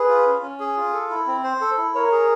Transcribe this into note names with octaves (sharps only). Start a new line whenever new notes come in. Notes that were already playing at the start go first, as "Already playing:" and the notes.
Already playing: G#4 B4
F4
C#4
C#4
G#4
F4
A4
E4
C4
C5
A4
E4
A#4 C#5
G#4